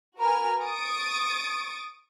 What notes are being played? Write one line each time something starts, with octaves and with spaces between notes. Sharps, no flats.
F#4 A#4 B4 G#5 F6
C#6 D#6 A6 D7